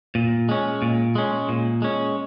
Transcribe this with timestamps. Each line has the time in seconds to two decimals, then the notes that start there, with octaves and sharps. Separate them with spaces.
0.15 A#2
0.49 G#3 C#4
0.82 A#2
1.15 G#3 C#4
1.49 A#2
1.82 G#3 C#4